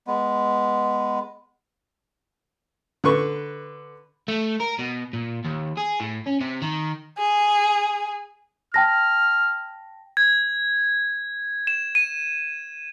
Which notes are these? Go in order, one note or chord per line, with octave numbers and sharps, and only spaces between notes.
G#3 B3
D3 B4 C#6
A3
A#4
B2
A#2
D#2
G#4
A2
C#4
C3
D#3
G#4
G5 A5 F6 A#6
G#6
E7
D#7